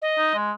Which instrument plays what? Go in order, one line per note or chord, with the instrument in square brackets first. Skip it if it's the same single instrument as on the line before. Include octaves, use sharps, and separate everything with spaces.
[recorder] D#5
[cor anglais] D#4
G#3